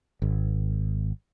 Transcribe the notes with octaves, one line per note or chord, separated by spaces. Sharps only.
G#1